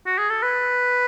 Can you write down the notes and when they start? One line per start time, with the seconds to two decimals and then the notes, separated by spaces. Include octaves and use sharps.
0.06 F#4
0.18 G#4
0.30 A4
0.43 B4